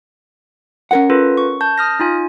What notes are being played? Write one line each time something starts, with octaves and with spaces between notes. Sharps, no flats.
C#4 A#4 F#5
F4 A4 B4
C#6
A5 G6
D#6 F6 A#6
D#4 F4 G#5